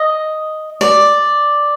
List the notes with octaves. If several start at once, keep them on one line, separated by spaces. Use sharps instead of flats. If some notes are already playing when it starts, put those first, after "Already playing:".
Already playing: D#5
D5